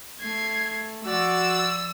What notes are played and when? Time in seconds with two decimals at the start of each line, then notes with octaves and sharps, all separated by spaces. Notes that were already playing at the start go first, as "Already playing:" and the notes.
0.20 A3 G#6 C7
1.06 F3 F#4 D5 E6